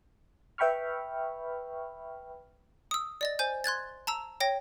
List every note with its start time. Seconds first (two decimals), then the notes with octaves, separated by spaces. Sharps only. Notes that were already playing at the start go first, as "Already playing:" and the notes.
0.58 B4 E5 G5 B5 C#6 F6
2.91 D#6 E6
3.21 D5 D#5 A6
3.39 C5 G#5 G6
3.64 C6 F#6 G#6 A6
4.07 A5 A#5 E6
4.40 C#5 G5 A#6